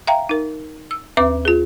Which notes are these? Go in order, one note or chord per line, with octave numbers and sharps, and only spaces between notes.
E5 F5 G5 A#5
D#4 A#4
E6
D#2 C4 B4 E5 D6
F4 G#4